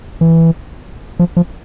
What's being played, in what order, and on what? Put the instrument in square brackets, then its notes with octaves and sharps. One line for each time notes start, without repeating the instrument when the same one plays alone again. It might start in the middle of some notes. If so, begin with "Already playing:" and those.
[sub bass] E3
F3
F3